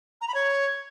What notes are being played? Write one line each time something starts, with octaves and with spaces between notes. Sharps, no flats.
A#5
B5
C#5